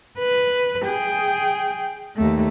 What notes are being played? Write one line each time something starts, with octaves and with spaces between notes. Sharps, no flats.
B4
G#4 G5
D#2 A3